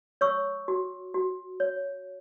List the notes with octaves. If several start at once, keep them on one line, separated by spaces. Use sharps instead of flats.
C#5 C#6 E6
F#4
F#4
C#5